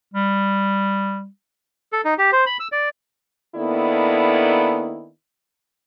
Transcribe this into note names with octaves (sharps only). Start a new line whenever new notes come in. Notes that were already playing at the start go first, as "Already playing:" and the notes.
G3
A4
D#4
G4
C5
B5
E6
D5
D#3 A#3 B3 D4 E4 A4